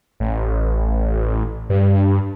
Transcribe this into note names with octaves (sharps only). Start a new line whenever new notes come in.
A1
G2